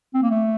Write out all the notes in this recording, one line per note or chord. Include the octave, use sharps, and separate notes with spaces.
C4
A#3
A3